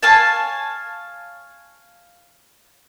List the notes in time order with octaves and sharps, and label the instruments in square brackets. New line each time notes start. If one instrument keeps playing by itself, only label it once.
[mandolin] C#5 F5 G#5 A5